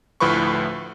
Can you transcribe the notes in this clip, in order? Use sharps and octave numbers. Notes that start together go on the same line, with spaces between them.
D2 A2 F3 B4 B5 C#6